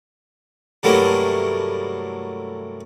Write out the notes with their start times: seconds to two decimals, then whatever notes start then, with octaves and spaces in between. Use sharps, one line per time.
0.83 G2 C3 F#3 A3 A#3 E4